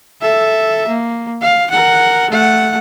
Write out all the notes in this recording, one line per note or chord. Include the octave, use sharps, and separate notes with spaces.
A4 E5
A#3
F5
A#4 F#5
A3 F#5